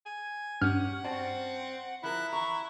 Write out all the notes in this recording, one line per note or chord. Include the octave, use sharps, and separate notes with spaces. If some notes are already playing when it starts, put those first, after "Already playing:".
G#5
G2 C#4 G4 F#5 F6 G6
C4 F#4 D5 A5
F3 E4 A#4 F#6
E3 A#5 C#6